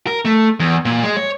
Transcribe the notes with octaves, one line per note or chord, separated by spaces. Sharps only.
A#4
A3
E2
A#2
G#3
C#5